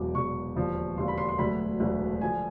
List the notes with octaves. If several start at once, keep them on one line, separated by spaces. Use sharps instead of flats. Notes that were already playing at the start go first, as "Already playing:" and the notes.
Already playing: E1 E2 B2 F#3 D6
E1 E2 B2 F#3 C#6
E1 D#2 D3 F3
E1 D#2 D3 F3 C6
B5
C6
C6
E1 D2 D3 F#3 B5
E1 D2 D3 F#3
D3 F3 G#5